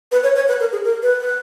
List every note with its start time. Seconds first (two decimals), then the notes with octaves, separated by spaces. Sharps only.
0.12 B4
0.23 C#5
0.36 C#5
0.48 B4
0.60 A#4
0.72 G#4
0.84 A#4
1.03 B4
1.21 B4